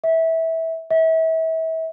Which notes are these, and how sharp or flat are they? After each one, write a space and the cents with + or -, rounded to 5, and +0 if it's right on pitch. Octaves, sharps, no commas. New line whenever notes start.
E5 -20
E5 -35